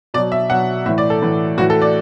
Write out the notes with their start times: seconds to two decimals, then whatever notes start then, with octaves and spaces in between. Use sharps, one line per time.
0.14 B2 F#3 D5
0.32 E5
0.50 B2 F#3 F#5
0.86 A2 E3 E5
0.98 D5
1.10 A4
1.22 A2 E3
1.58 A2 E3 F#4
1.70 A4
1.82 D5